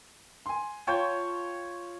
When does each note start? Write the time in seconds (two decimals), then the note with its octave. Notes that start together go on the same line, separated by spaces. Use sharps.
0.46 G#5 C6
0.87 F4 C#5 G5 A5 G6